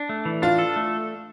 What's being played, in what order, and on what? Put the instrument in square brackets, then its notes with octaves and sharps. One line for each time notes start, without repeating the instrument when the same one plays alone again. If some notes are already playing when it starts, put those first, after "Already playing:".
Already playing: [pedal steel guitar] D4
A3
E3
[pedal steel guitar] D4 [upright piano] F4
[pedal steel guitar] A4
A3